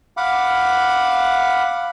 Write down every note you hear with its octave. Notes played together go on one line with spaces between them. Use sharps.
F5 F#5 B5 D6